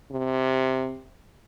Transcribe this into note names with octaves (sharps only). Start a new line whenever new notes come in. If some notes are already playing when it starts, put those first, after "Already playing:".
C3